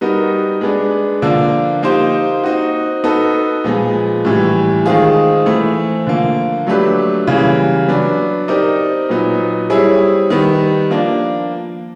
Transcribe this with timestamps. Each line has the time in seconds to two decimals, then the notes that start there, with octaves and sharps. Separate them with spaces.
0.01 G3 B3 D#4 F#4 A#4
0.61 G#3 B3 D4
1.22 D3 F3 A#3 D4
1.83 A#3 D#4 G4 C5
2.43 C4 D#4 F#4
3.04 B3 D#4 F#4 A4
3.64 A#2 F3 G#3 B3
4.25 A2 E3 G3
4.86 D#3 G#3 C4 F4 G#4
5.46 E3 A3 C4
6.07 D3 F3 A#3
6.67 F#3 A3 D4 G4 B4
7.27 C#3 E3 G3 A#3
7.88 F#3 B3 D4
8.48 C4 D#4 G4 A#4 D5
9.09 A#2 F#3 B3 D#4
9.70 G3 C4 E4 G#4 C#5
10.30 D#3 G3 B3
10.91 F3 A#3 D4